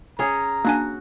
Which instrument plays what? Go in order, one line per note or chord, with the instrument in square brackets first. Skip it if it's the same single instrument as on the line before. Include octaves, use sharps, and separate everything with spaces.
[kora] C#4 G#4 [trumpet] A#5
[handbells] A#3 D4 G#5 [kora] F#4